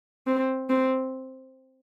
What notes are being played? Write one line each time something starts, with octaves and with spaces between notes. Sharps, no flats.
C4
C4